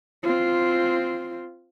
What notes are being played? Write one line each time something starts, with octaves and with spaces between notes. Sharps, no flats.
C4 F4